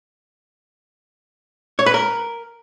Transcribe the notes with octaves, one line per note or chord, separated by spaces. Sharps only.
C#5
B4
A#4